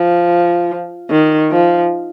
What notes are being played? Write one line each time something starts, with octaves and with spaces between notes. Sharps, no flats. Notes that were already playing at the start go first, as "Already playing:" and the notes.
Already playing: F3
D#3
F3